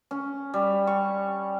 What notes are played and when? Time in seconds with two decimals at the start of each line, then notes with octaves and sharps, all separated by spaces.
0.11 C#4
0.54 G3
0.87 C#6